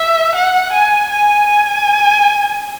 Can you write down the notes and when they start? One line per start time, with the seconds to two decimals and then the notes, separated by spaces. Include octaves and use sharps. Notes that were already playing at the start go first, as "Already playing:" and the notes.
Already playing: E5
0.35 F#5
0.73 G#5
1.10 G#5
1.47 G#5